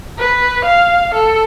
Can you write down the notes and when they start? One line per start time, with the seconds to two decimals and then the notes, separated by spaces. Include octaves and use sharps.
0.19 B4
0.65 F5
1.14 A4